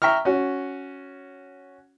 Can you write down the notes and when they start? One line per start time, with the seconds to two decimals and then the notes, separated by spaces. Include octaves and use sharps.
0.02 E5 G5 A#5 C#6 F6
0.25 C#4 F#4